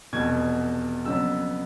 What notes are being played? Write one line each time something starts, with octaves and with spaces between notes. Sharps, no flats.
F1 E2 B2 G#6
F2 C#3 F#3 B3 E6